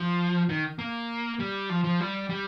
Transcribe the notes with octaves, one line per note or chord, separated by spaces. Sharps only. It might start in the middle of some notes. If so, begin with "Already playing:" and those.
Already playing: F3
D#3
A#3
G3
F3
F3
G3
G3